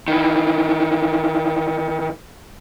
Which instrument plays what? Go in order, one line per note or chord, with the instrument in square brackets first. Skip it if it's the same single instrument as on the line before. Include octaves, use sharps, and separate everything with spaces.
[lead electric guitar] D#3 E3